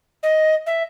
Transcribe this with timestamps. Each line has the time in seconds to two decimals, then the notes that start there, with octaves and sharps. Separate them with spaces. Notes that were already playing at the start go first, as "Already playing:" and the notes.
0.23 D#5
0.66 E5